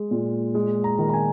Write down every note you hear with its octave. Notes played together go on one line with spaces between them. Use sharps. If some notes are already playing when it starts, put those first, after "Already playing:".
Already playing: G#3
A#2
G#3
A#5
D#3
A#5
G#5